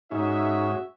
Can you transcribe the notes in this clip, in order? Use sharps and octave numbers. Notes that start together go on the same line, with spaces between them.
G#2 C#4 D#4 F#4 E5